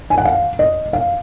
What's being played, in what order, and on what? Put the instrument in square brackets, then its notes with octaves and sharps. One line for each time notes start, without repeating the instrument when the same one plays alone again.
[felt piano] G#5
F#5
F5
D#5
F5